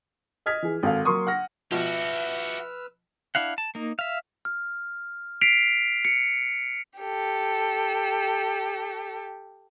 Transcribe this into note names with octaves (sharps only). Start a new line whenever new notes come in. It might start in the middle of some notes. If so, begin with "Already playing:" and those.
D#5 D#6 F6 G#6 B6
E3 G#4
G#1 A4 F5
F#3 A#3 C6 C#6 D#6
F#5 F6 A#6
B2 F3 F#4 G4 B4 E5 E6 F6
D4 E4 F5 F#5
A5
A#3 D#4
E5 F5
F6
B6 C7 D7 F7
C#7
G4 A4